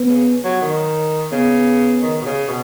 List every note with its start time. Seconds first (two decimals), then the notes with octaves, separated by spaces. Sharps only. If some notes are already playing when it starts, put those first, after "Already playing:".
Already playing: B3
0.09 C#3
0.44 F#3
0.61 D#3
1.32 C#3 B3
2.02 D#3
2.21 B2
2.25 C#3
2.48 B2